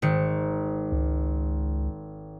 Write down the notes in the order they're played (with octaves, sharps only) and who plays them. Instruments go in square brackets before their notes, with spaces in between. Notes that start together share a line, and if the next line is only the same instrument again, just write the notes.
[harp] G#1 D#3 C#7
[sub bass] C#2